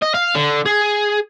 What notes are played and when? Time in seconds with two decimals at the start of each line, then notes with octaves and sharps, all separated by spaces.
0.02 D#5
0.15 F5
0.35 D3
0.66 G#4